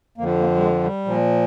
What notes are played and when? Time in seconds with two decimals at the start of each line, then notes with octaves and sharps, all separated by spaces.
0.18 F2 A#3
0.21 D3 F3
0.39 A#3
0.55 G3
0.61 G#3
0.84 G3
1.05 A#2 F3